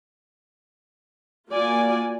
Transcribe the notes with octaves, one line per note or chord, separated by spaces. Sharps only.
A#3 F4 F#4 D5 G#5